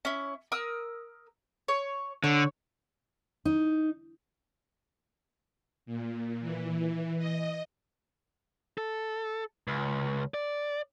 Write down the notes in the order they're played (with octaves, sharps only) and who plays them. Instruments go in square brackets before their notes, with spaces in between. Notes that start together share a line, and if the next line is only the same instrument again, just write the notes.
[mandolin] C#4 E4
A#4 D#6 E6
C#5
[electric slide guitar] D3 [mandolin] C#5
[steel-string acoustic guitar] D#4
[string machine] A#2
E3
D#5
[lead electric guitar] A4
C#2
D5